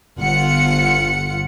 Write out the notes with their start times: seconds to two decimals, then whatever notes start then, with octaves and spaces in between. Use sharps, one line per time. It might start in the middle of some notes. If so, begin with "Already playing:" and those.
0.18 G1 F4 F#5 C#7